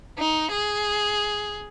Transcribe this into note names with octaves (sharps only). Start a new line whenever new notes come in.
D#4
G#4